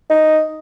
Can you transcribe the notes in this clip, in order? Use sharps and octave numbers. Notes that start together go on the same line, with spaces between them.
D#4